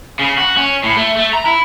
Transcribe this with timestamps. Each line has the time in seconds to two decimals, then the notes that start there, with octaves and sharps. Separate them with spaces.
0.19 C#3
0.38 F#4
0.57 C#4
0.84 A2
0.97 A3
1.17 A3
1.33 A#5
1.46 E4